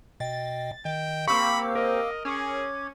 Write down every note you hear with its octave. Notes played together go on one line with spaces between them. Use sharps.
B2 D#5 G5 A6
D#3 D#5 G5
A#3 C4 G4 F5 B5 C#6 D6 E6
A#4 D#5
C#4 G#4 D6 G#6